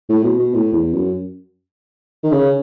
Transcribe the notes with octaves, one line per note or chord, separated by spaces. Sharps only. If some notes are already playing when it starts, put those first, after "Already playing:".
A2
B2
B2
A2
E2
F#2
D#3
C#3